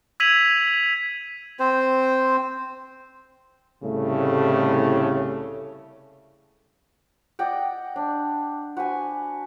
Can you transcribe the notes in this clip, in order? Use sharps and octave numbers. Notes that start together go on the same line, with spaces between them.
E6 G#6 B6 D#7 F7 F#7
C4 C5
C2 A2 C#3 G3 A3
D5 D#5 F#5 G5
D4
F#4 B4 C5 G#5